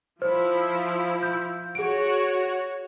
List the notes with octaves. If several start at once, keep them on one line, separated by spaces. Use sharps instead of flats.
F3 E4 C5
G6
F#4 G#4 C#5 D7